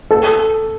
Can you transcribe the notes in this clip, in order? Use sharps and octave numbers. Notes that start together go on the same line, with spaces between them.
A4